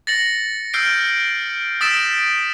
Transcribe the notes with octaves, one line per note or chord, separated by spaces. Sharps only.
A6 A#6 C#7 F#7
E6 F6 G6 C7 D7
D#6 E6 A6 B6 D7 E7